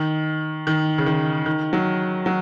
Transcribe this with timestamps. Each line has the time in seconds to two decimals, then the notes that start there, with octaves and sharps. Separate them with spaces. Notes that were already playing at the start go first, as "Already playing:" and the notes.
Already playing: D#3
0.67 D#3
0.98 C#3
1.06 D#3
1.46 D#3
1.73 F#3
2.26 F#3